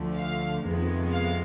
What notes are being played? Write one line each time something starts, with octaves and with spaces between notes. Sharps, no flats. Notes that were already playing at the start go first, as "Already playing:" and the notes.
Already playing: D2 D3 F3 A3
F5
F2 C3 D#3 G#3 B3
F5